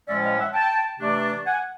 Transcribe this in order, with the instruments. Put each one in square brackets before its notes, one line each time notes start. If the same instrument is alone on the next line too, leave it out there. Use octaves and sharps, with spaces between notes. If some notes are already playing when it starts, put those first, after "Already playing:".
[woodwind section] A2 F3 G#3 C#4 D5 E5
D#5 F5
E5 F#5
G5 A5
C3 E3 A3 D4
F#5 G#5